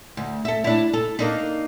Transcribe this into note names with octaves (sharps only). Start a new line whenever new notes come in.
D2
A4 E5
D4 E4
A4
A#3 D4 D#4